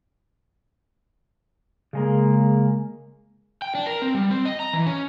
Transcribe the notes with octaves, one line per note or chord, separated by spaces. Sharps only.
C#3 G#3 A#3
G5
D4
A#4
C4
G3
C4
D#5
A#5
E3
C#4